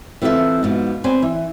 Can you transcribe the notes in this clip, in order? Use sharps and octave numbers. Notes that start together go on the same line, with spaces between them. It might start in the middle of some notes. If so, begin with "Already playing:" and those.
E3 C4 F4 A4 E5
G#2 B2 F3
C4 B4 C5 D5 G#5
E3